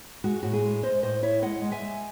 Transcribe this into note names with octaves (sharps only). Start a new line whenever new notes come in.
G#3 F#4
A2 F#4
G#4
G#3
G#3 C5 D#5
A2 C5 D#5
E4 C#5 E5
G#3 D#5 F#5
G#3
E5 G#5
G#3